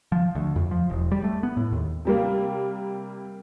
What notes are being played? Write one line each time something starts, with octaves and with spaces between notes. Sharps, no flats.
F3
D2
F2
F3
E1
G3
A3
B3
A2
D#2
C3 G3 A#3